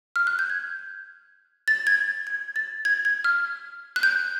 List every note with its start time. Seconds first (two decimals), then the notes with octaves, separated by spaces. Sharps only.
0.16 F6
0.27 F#6
0.39 G6
0.50 G#6
1.68 A6
1.87 G#6
2.27 G#6
2.56 A6
2.85 G#6
3.05 G#6
3.24 F6
3.96 F#6
4.03 G6